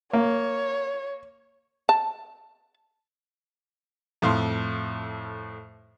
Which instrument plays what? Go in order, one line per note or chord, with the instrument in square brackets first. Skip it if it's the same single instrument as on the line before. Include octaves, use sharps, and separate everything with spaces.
[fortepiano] A#3 [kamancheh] C#5
[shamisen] A5
[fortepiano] F2 A2 F5 C6